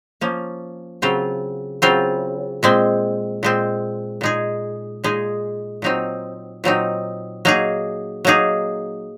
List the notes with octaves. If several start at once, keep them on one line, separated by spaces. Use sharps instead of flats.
F3 A#3 C#4
C#3 F#3 C4 F4
C#3 F#3 C4 F4
A#2 G#3 C4
A#2 G#3 C4
A#2 G#3 D#4 G#4
A#2 G#3 D#4 G#4
A#2 F#3 C4 D#4
A#2 F#3 C4 D#4
F#3 A#3 D#4 G#4
F#3 A#3 D#4 G#4